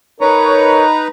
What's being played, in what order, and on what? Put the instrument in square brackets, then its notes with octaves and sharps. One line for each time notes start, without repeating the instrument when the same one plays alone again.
[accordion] D#4 B4 A#5 [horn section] A#4 C#5